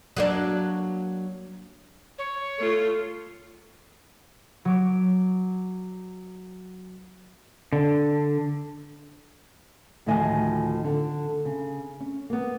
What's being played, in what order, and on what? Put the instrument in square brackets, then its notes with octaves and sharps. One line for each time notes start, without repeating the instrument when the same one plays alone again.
[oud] F#3 A#3 D4
[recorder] C#5
[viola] A3 F4
[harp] F#3 D6
[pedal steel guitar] D3
[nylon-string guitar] D2 A2 D#3 F3 D#5 G#5
D3
C#3
C#4
A#3 B3